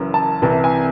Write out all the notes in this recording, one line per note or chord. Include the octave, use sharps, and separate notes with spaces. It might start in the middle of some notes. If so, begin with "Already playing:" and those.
Already playing: F#1 F#2 E3
A5
C2 C3 E3 A5
G#5